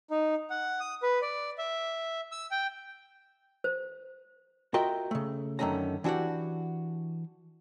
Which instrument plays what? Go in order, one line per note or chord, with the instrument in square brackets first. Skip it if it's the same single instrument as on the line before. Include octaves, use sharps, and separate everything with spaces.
[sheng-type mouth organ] D#4
F#5
D#6
B4
D5
E5
E6
G5
[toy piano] C5
[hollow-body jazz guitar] F4 F#4 A#4 D#5 E5 G5
C#3 A3
F#2 D3 D#3 A3 C#4 A#5
E3 D4 F#4 G4 F#5